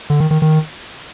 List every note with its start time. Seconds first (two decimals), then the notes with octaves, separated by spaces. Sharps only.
0.10 D3
0.20 D#3
0.31 D#3
0.42 D#3